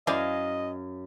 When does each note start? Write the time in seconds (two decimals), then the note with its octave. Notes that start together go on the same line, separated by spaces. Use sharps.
0.07 F#2 E4 C5 D5 D#5 F5 G#5